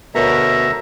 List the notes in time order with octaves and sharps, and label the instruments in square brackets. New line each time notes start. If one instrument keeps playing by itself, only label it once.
[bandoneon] D2 E5 A#5 [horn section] B2 [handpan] A4 A#4 C#5